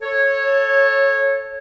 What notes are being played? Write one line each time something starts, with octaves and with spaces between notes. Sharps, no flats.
A4 C#5